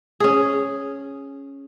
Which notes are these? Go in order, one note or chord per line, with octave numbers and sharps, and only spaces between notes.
C#4 G#4